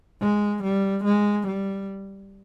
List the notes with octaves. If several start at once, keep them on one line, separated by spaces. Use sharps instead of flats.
G#3
G3
G#3
G3